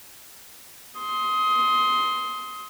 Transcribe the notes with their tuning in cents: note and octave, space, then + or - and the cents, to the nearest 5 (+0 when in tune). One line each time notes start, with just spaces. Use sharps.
C6 +0 D#6 +25